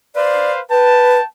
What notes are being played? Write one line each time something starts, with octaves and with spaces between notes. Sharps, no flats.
B4 C5 D5 F5
B4 G5 A5